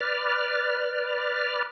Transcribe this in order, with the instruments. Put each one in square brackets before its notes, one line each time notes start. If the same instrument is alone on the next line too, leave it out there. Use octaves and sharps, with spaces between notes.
[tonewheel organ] B4 D5 F6